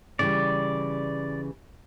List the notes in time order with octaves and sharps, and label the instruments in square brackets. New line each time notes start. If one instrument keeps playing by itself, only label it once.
[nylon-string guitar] C#3 E3 G3 [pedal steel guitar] D5